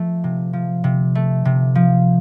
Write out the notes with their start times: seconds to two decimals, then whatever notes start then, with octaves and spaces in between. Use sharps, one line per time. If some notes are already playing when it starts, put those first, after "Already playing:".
Already playing: F3 A3
0.24 C3
0.53 F3
0.84 C3
1.15 A3
1.45 C3
1.75 F3